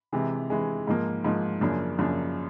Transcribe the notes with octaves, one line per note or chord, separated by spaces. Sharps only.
C3 E3 G#3
C3 E3 G#3
G#2 F3 A#3
G#2 F3 A#3
F#2 C#3 F3 A#3 D4
F#2 C#3 F3 A#3 D4